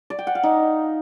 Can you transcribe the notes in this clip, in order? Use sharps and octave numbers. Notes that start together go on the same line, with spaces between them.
D5
G5
F#5
F5
D#4